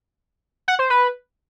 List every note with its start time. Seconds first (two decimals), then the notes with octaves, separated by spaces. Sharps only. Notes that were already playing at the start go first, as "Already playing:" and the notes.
0.68 F#5
0.79 C5
0.90 B4